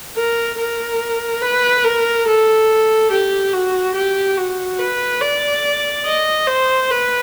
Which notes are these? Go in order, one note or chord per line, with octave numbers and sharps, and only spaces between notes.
A#4
A#4
B4
A#4
A4
G4
F#4
G4
F#4
B4
D5
D#5
C5
B4